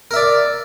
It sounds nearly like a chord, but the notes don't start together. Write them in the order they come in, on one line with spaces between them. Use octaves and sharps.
A#4 E5 D5